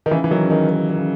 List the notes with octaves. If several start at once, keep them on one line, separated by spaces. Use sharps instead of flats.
D#3
C#3 E3
E3
D#3 F#3
C#3
D#3
D#3
D#3
C#3